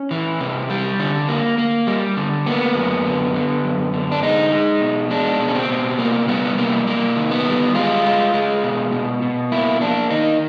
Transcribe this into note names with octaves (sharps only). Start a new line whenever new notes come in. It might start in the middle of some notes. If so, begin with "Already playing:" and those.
Already playing: C#4
E3
C3
G3
D3
A#3
A#3
G3
D3
A#3 B3
F#2
D3
D3
F#2
D3
D4
G#3 D#4
G#3
B2
G#3 D4
B2
C#4
C4
B2
C3 A#3
G3 B3
C3 A#3
C3 A#3
D#3
B3
G3
G#3 F4
G#3
G#3
B2
B2
B2
A#3 E4
A#3 D4
D#3 D#4